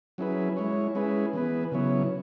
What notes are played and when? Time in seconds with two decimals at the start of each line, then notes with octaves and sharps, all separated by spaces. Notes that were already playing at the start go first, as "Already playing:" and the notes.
0.18 F#3 C#4 E4 G#4 B4
0.57 G#3 E4 C#5
0.95 G#3 C#4 E4 G#4 B4
1.33 E3 B3 G#4 B4
1.72 C#3 F#3 B3 E4 C#5